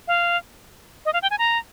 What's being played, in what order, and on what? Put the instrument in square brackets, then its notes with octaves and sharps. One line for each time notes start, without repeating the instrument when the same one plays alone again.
[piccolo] F5
D#5
F5
G5
G#5
A#5